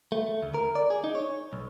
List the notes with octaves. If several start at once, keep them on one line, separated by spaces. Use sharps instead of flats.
A3
D2
A#4
D5
G#4
D#4
C#5
B1